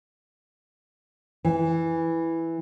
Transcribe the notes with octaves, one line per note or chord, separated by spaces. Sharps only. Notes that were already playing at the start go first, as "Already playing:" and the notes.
E3